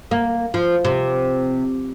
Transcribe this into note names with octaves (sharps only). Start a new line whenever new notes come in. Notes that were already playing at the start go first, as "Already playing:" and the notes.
A#3
F3
C3